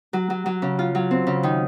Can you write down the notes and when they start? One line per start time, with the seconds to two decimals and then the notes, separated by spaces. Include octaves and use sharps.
0.13 F#3
0.30 F#3
0.46 F#3
0.62 C#3
0.79 F4
0.95 F#3
1.11 C4
1.27 C#3
1.43 D#3